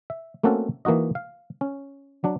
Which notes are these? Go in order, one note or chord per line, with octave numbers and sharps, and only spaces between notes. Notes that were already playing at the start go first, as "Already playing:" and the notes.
E5
A3 A#3 C4 C#4 F#4 A4
E3 A#3 D#4 F#4 D#5
F5
C#4
F#3 D4